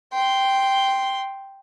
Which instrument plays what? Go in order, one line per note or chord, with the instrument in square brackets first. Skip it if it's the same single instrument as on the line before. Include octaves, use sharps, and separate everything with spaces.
[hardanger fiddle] G5 C6